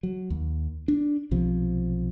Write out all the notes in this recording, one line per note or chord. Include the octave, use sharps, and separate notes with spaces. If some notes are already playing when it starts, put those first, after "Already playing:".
F#3
D#2
D4
B1 C3 F3